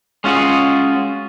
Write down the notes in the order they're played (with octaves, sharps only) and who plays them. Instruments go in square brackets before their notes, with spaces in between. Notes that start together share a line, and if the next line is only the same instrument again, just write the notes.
[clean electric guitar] G#3 C#4 F4 F#4 G#4